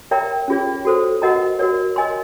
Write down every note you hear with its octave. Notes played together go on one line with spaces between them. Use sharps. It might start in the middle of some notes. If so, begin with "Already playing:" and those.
A#4 C#5 E5 G5 A#5
C#4 F4 G#4 C#5
F#4 A4 C5
F#4 A#4 D#5 F#5 A#5
F#4 A#4 C#5
A#4 D#5 G#5 C6